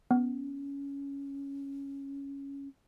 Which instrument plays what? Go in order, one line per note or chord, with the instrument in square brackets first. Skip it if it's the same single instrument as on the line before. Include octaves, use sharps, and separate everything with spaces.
[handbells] B3 [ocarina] C#4